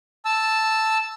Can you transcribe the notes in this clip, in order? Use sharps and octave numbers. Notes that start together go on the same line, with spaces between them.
A5 E6